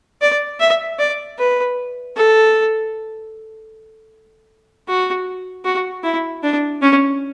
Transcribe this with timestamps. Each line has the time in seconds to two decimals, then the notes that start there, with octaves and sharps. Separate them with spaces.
0.21 D5
0.60 E5
0.99 D5
1.38 B4
2.16 A4
4.88 F#4
5.65 F#4
6.03 E4
6.43 D4
6.82 C#4